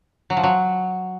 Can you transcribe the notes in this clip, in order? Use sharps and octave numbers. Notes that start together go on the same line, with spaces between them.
F#3
F3
F#3